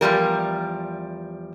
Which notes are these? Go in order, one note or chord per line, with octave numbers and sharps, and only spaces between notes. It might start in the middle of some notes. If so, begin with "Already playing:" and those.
E2 F3 G3 A#4